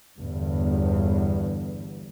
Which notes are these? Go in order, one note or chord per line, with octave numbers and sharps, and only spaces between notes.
G1 E2 G2